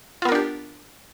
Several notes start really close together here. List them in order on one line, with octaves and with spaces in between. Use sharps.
F4 B3 A#4 D4 G4